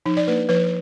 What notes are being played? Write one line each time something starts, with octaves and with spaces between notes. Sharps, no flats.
F3 D#4
D5
A#3 D4 B4
F3 B4